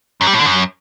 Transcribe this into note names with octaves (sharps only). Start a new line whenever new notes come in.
F#2
G3
A2
D3
F#2